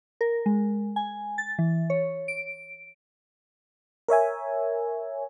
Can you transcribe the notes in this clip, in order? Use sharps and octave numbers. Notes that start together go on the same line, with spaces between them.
A#4
G#3
G#5
A6
E3
C#5
D7
A#4 C#5 E5 G#5